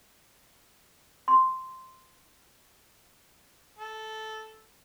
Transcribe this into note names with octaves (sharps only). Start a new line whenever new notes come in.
C6
A4